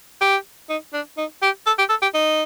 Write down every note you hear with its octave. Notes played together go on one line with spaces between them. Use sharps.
G4
D#4
D4
D#4
G4
A4
G4
A4
G4
D#4